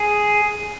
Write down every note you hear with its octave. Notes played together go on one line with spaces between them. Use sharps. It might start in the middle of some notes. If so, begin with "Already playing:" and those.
Already playing: G#4